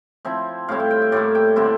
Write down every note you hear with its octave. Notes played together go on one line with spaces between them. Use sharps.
F3 C4 E4 E5
A2 G3 C4 E4 F5
G5
G5
E5
A2 G3 A#3 E4 D5
G5
D3 G3 C4 E4 E5